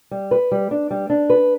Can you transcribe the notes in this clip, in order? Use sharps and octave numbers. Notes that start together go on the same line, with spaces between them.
G3
B4
G3
D4
G3
D4
B4